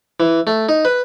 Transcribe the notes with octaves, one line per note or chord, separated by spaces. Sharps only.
E3
A3
D#4
B4